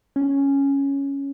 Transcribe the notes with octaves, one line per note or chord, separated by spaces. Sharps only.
C#4